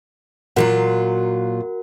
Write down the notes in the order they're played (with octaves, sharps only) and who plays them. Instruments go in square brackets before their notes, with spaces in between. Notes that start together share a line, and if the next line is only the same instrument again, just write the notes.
[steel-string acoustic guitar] A#2 F#3 F4 [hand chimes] F#4 A#4 F#5